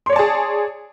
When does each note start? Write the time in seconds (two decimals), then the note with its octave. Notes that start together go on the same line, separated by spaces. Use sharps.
0.06 C6
0.09 C#5
0.13 D5
0.16 A5
0.19 G#4